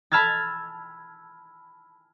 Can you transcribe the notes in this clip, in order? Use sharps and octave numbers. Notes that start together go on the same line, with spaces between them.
A5 B5 E6 F6 G#6 A6